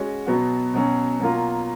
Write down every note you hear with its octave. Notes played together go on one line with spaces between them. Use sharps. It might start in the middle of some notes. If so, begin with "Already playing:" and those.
Already playing: G#3 C#4 F#4
B2 F#3 B3 F#4
B2 F#3 C#4
B2 F#3 A#3 F4